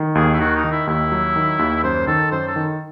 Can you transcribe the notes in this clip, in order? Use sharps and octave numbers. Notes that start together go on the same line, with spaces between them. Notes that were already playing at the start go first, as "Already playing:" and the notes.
Already playing: D#3
D#2 G#4
E4
D#3 F#4
D#4
D#3
E4
D#2 E4
F#3
D#3
D#2
F#2 C5
D#3 A4
F#2 C5
A4
D#3